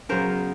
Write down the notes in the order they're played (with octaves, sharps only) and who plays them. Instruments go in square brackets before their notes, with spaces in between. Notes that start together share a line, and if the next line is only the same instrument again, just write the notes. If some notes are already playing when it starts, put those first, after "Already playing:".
[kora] C#3 F#3 B3 A#4 C5